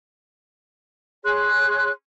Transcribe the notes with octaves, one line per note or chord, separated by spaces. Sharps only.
G#4 C#5 C6 F#6